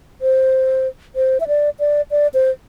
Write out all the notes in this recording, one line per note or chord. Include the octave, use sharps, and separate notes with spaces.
C5
C5
E5
D5
D5
D5
C5